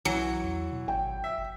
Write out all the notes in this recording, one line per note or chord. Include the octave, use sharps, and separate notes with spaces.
B1 E3 F#3
E2
B2
G#1 G5
E5
F#1